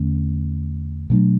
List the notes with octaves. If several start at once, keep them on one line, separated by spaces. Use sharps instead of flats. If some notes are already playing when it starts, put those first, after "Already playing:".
Already playing: E2 D3 A3 C#4
B2 F#3 A3 D4